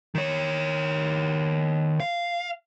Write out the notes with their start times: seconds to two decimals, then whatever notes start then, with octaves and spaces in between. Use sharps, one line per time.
0.15 D#3 C#5
2.00 F5